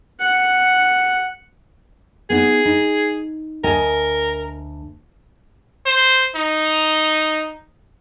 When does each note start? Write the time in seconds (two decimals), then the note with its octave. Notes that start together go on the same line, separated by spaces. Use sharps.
0.21 F#5
2.30 B3 D#4 G#4
2.65 D#4
3.64 D2 A#4 D#5 G#5
5.86 C5
6.36 D#4